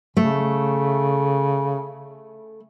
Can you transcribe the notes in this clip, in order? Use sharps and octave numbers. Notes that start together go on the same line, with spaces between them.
C#3 A3